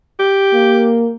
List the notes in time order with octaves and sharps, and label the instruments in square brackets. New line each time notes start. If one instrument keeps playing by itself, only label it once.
[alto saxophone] G4
[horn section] A#3